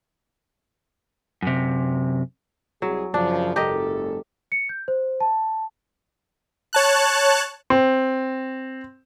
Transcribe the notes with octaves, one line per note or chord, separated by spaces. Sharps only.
F#2 C3
C2 F#3 G#4
F#2 C#3 F3 D4
F#1 G#2 G4 A4 A#4 D#5
C#7
G6
C5
A5
C#5 A5 F#6
C4